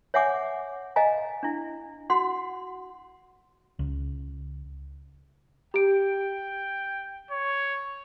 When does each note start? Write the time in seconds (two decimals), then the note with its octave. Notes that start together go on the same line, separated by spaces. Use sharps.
0.14 C#5 E5 F#5 G#5 D6
0.96 D#5 F5 G#5 A#5
1.43 D4 E4
2.10 F#4 F#5 C6
3.79 C#2
5.74 G4 G5 D7
7.31 C#5